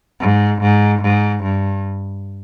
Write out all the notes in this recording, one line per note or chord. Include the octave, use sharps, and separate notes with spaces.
G#2
G#2
G#2
G2